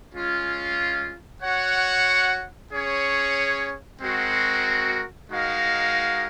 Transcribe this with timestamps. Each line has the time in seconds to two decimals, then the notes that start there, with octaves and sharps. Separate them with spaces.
0.13 G#3 C#4 F4
1.41 F#4 C#5 F#5
2.71 C#4 G#4 C#5
4.01 G#3 C4 F#4 A#4
5.30 G#3 D#4 F#4 A#4 F5